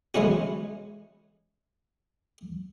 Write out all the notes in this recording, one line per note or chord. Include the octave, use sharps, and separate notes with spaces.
E3 G#3 B3 C#4 F#4